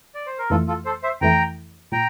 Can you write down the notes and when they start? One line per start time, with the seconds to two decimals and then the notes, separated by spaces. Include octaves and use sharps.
0.15 D5
0.26 C5
0.39 A#4
0.50 F2 E3 A3 E4 F4 A4
0.68 F4 A4
0.85 A4 C5
1.03 C5 E5
1.21 F2 E3 A3 E4 G5 A#5
1.92 A#2 G5 A#5